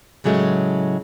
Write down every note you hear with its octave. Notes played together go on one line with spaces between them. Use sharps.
A2 C#3 F#3 G#3 A3